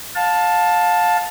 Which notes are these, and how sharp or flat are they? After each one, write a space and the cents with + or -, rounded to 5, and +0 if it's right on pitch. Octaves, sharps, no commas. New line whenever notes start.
F5 +25 A5 +0